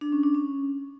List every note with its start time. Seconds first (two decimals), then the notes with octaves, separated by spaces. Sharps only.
0.01 D4
0.12 C#4
0.23 D4
0.35 C#4